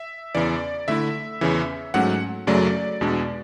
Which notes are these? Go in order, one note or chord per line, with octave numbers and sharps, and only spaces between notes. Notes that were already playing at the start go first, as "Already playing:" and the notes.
Already playing: E5
E2 C#3 E3 D5
D3 A3 E4 E5
E2 C#3 E3
G#2 F#3 A3 C#4 F#5
F#2 C#3 F#3 A3 D5
E2 B2 G#3 D4